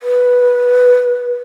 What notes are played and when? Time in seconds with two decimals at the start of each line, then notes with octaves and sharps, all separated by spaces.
0.02 B4